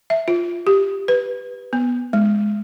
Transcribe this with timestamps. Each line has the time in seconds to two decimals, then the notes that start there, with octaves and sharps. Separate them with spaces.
0.10 E5
0.28 F4
0.67 G4
1.08 B4
1.73 B3
2.13 G#3